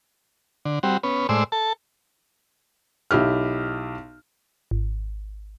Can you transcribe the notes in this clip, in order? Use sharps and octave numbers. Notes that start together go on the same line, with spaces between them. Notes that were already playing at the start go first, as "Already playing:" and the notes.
D3
G3 C4 F#4
B3 C#4
A2 G#3 C5 D5 E6
A4 A5
B1 E4 G4 F6
G#1